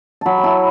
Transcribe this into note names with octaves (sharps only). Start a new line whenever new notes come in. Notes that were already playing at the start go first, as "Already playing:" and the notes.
F#3 A5 B5
G5
E4 A5